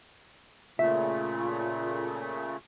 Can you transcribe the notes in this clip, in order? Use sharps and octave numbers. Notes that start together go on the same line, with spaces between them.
A#2 C#3 A3 F4 E5